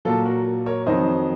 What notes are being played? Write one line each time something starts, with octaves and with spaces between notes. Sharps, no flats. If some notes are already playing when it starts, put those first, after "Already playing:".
A#2 F#3 F4 A4
F#4 A#4
A#4 C#5
F2 D#3 F#3 C5 D#5